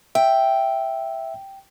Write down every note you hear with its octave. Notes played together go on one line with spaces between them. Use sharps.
E5 G5